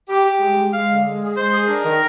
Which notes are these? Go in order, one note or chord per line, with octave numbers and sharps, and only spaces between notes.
G4
G4
G#3
G#3
G#3 F5
D3
G#3
G#4
G#3 C5
G#4
D4 A#4
D#3